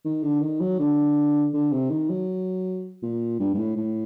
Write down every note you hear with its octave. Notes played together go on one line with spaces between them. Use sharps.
D#3
D3
D#3
F#3
D3
D3
C3
D#3
F#3
A#2
G2
G2
A2
A2